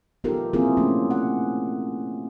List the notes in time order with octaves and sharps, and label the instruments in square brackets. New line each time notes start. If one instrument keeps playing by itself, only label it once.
[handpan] B3 D#4 F4 G4 A4 A#4
A#3 C4 E4 F4 G#4 A#4
A3 A#3 C#4
F#5